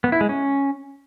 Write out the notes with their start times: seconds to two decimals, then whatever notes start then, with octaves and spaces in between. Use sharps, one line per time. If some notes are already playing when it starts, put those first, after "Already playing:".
0.04 B3
0.12 E4
0.21 G#3
0.29 C#4